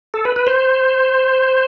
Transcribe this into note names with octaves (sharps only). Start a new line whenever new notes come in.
A4
B4
B4
C5